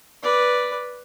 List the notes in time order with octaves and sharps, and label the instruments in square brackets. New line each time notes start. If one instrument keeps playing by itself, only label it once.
[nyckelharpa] B4 D5